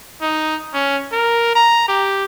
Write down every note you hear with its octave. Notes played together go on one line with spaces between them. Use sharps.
D#4
C#4
A#4
A#5
G4